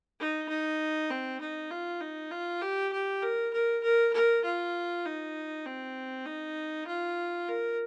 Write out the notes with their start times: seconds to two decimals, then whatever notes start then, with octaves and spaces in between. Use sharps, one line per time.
0.20 D#4
0.49 D#4
1.10 C4
1.41 D#4
1.71 F4
2.01 D#4
2.31 F4
2.62 G4
2.93 G4
3.22 A#4
3.54 A#4
3.84 A#4
4.13 A#4
4.45 F4
5.06 D#4
5.66 C4
6.26 D#4
6.87 F4
7.49 A#4